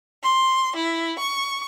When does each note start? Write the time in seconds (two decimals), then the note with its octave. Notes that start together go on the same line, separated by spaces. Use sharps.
0.23 C6
0.74 E4
1.19 C#6